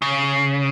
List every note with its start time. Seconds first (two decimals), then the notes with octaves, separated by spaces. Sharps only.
0.02 C#3